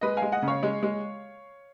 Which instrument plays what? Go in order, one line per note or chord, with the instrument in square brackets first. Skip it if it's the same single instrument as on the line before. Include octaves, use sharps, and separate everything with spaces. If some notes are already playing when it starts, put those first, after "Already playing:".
[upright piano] G#3 B4 D#5
F5 G#5
G#3
D#5 F#5
C#3
C#5 F5
G#3
G#3